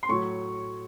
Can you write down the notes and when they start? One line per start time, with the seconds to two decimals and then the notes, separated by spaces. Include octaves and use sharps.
0.03 C6
0.09 A2 F#3 C#6